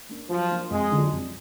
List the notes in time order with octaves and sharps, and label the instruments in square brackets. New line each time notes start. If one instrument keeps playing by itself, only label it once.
[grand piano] A#3 D4
[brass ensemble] F3 [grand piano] F#3
[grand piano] A#3 D4
[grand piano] F2 [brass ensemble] G#3
[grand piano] D3 F#3 D4 F4
F2